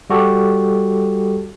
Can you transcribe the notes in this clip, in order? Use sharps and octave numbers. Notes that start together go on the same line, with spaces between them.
G3 F#4 G4 A4